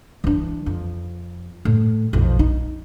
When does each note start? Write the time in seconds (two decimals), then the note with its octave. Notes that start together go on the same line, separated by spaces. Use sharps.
0.24 E3 D4
0.66 F2
1.65 A2
2.13 B1 F2
2.39 D#4